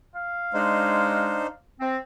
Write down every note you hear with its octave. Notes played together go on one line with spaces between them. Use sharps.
F5
G#3 D4 D#4 C5
C4